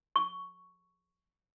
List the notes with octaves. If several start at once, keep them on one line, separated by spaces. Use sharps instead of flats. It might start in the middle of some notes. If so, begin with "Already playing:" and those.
C#6